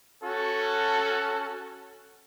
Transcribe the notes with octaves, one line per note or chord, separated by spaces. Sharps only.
C#4 F#4 A4